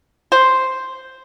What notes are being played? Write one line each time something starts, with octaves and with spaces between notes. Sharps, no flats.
C5